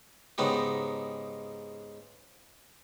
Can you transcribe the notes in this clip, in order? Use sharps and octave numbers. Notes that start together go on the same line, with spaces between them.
G#2 C#3 B3 D#4 G4